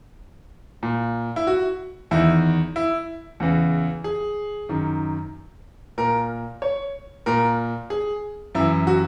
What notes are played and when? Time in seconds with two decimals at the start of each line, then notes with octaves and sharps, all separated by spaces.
0.83 A#2
1.36 E4
1.47 F#4
2.11 E2 D#3 E4
2.76 E4
3.40 E2 C#3 E3
4.04 G#4
4.69 F#2 D#3
5.98 A#2 A#4
6.62 C#5
7.26 A#2 A#4
7.90 G#4
8.55 F#2 E3 E4
8.87 F#4